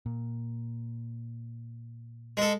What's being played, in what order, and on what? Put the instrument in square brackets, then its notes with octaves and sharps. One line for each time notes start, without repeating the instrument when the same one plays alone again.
[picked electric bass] A#2
[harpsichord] G#3 A4